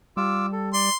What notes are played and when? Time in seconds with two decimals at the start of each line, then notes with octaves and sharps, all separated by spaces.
0.17 G3 F4 D6 E6
0.52 A4
0.74 D5 C6